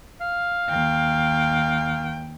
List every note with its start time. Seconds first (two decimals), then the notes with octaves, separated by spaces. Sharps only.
0.21 F5
0.70 D#2 G5